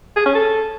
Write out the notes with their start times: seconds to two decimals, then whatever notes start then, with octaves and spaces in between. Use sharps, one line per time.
0.17 G#4
0.26 C#4
0.35 A4